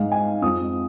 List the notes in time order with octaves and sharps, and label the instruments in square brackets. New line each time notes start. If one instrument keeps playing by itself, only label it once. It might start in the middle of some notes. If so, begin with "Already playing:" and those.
Already playing: [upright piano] G#2 G#3 F5
G#5
F2 F3 G#3 D#6